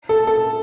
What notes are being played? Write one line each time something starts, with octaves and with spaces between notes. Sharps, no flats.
A4
A4